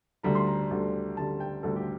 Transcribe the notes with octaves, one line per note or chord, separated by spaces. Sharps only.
D2 D3 G3 A#5
C6
A#5
D2 D3 G3
D2 D3 G3 A5
G5
D2 D3 G3 A4
G4